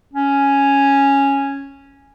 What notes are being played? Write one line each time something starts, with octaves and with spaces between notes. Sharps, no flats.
C#4